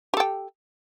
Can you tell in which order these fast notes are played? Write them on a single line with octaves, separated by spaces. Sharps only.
G4 A4 G5